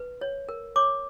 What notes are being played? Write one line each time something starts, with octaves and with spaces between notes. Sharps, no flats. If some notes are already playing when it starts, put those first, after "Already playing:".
Already playing: B4
C#5
A#4
C#5 D6